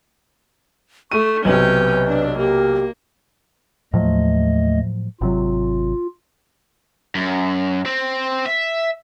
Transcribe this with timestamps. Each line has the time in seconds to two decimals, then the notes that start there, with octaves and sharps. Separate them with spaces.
1.12 A3 C#6 D#7
1.45 B1 C3 C#4 B4 G5
2.06 D4
2.38 A#3 G4
3.94 D#2 A2 F3 F#3 A3 D#5
5.21 G#1 C3 F#3 F4
7.15 F#2
7.86 C4
8.46 E5